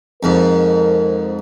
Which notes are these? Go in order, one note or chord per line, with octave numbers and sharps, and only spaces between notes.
F2 G#2 A#4